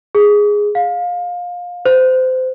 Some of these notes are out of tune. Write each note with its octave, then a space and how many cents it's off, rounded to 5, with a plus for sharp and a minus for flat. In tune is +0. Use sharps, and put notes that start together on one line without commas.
G#4 -5
F5 +25
C5 -25